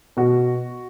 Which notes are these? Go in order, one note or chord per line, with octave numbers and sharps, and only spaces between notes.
B2 F#4